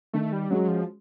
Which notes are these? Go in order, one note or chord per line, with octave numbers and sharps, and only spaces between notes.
D#3 A3
G3
F#3 G#3 C#4 F#4
F3